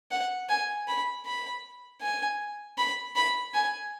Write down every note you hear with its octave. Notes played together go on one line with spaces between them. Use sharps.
F#5
G#5
B5
B5
G#5
B5
B5
G#5